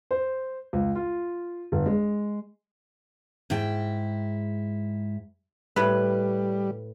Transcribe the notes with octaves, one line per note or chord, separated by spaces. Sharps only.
C5
C#2
F4
G1
G#3
G#2 E4 G5
A2 G3 B4